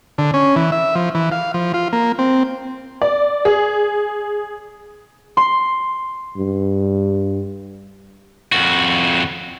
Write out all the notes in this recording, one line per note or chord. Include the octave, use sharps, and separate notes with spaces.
D3
C#4
E3
E5
F3
E3
F5
F3
F4
A#3
C4
D5
G#4
C6
G2
F2 F#4